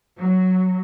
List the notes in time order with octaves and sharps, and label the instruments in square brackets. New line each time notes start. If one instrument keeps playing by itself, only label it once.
[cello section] F#3